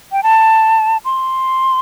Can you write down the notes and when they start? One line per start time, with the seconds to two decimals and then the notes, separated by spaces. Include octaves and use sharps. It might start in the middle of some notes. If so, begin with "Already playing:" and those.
0.12 G5
0.23 A5
1.05 C6